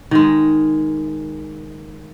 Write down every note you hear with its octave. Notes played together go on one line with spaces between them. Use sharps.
D#3 G#3